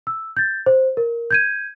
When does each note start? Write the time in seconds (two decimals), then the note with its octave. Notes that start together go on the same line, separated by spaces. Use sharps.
0.07 E6
0.37 G6 A6
0.66 C5
0.97 A#4
1.31 G6 G#6 D#7